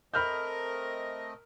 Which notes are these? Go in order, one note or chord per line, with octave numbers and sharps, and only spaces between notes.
A3 C4 A#4 D#5 B5 F6 G6